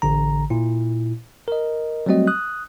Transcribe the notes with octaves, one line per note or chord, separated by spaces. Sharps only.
A1 D3 A#5
A#2 E4
A#4 D#5
F#3 G3 A3 C4 F#4 D#5
D#6 F#6